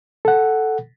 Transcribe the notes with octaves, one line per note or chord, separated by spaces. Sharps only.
A4 F#5